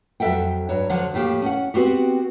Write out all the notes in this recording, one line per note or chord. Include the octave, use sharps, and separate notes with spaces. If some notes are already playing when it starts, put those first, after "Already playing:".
F2 F#3 A4 E5 F#5 G5
G2 F#3 C#5
D3 F3 F#3 F#5
A2 A3 A#3 G4
C#4 F#5
B3 C4 F#4 G4